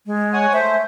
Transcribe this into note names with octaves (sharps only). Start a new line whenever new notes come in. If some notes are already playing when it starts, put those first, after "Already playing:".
G#3
C#5 F#5 G#5
A3 C5 E5